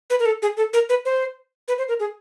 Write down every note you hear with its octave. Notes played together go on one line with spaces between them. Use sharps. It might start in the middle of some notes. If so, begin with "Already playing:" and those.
B4
A#4
A4
G#4
A4
A#4
B4
C5
B4
C5
A#4
G#4